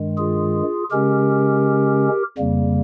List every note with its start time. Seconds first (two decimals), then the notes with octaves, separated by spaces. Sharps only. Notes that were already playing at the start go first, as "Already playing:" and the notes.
Already playing: G2 D#3 G#3
0.18 F4 G#4
0.91 C#3 G#3 C#4 G4 A#4
2.38 F2 C#3 G3 A#3